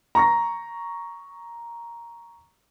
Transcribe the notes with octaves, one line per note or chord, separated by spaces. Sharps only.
A#5 C#6 A#6